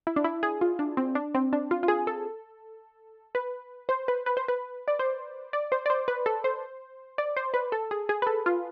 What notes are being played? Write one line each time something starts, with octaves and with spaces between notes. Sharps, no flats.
E4
D4
E4
G#4
F4
D4
C4
D4
C4
D4
F4
F4
G#4
A4
B4
C5
B4
B4
C5
B4
D5
C5
D5
C5
D5
C5
B4
A4
C5
D5
C5
B4
A4
G#4
G#4
B4
A4
F4